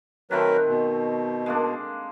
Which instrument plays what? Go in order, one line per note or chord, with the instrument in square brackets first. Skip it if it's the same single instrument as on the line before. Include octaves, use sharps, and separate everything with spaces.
[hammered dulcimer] D#3 A3 C4 [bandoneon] F#3 A#4 B4
[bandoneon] B2
[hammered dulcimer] G#3 A#3 D4